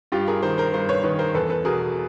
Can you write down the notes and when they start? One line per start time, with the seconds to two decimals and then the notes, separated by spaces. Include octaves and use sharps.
0.12 G2 F4 G4
0.28 G#4 A#4
0.43 D#3 A#4 C5
0.58 A#4 C5
0.73 G2 A#4 C5
0.89 B4 C#5
1.04 D#3 B4 C#5
1.19 A#4 C5
1.34 E2 A4 B4
1.50 A4 B4
1.65 B2 G#4 A#4